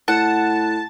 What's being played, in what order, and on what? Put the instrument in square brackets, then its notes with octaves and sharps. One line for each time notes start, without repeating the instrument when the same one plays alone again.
[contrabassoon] A2 [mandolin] F#5 [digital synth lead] A5